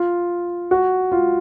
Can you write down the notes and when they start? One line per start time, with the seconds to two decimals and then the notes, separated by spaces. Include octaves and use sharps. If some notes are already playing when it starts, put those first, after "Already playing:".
Already playing: F4
0.71 F#4
1.12 F4